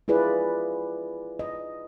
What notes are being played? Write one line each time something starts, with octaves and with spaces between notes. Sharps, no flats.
E4 F4 G#4 B4 D5
D#5